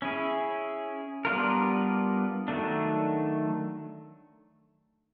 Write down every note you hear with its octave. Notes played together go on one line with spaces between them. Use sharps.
C#4 E4 G#4
G3 B3 D4 F4 A#4
D#3 F#3 A3 D4